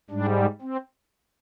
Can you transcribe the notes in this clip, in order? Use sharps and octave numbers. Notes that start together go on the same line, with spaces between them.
G#2 G3 D4
C4